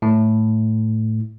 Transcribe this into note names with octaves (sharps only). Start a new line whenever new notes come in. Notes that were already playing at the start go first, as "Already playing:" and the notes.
A2